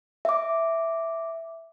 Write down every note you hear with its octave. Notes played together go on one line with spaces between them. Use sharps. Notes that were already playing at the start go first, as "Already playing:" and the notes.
E5 D6